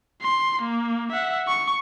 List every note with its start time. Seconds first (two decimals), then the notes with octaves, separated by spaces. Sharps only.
0.22 C6
0.63 A#3
1.12 E5 F#5
1.47 C#6